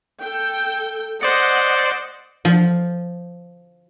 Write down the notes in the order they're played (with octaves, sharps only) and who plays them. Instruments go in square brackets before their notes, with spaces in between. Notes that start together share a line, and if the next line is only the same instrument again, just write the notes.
[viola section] A4 G5
[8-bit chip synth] C5 D5 C#7 [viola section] D#5 F#5
[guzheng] F3